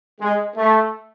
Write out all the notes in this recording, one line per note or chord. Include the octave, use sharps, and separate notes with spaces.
G#3
A3